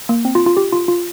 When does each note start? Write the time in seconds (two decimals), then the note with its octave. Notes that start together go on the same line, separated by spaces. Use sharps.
0.09 A#3
0.25 C4
0.35 F4
0.46 F4
0.57 G4
0.72 F4
0.88 F4